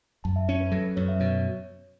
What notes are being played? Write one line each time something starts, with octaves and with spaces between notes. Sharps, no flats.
F#2 A5
E5
C#4 C#5
B4
F#3 A4
B4
F#2 C#5
E5
B2 C#5